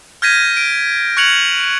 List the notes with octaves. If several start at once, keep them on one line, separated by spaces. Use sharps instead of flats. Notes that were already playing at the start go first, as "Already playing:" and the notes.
F6 G6 G#6 A#6 B6 D#7
D7
C#6 F#6 G#6 C#7 F7 F#7